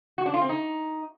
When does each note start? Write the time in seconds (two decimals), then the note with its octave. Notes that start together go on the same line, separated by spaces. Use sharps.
0.18 F#4
0.26 D4
0.34 F4
0.41 C4
0.49 D#4